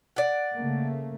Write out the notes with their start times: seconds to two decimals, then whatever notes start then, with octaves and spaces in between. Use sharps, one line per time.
0.16 D5 F#5
0.54 C#3 A3 A#3